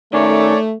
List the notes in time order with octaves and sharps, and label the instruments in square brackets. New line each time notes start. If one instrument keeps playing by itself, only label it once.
[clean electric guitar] D#3 C#4 [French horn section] A3 [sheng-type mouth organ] C#5 D5